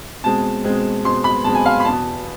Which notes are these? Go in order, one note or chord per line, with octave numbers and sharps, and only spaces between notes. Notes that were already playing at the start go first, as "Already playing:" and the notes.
B2 G#3 C4 A5
B2 G#3 C4
B2 G#3 C4 C6
B5
B2 G#3 C4 A5
G#5
F5
B5
E2 B2 B3 A5